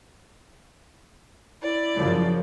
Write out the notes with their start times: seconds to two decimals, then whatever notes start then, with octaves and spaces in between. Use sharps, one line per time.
1.62 E4 D5
1.94 F#2 C#3 F3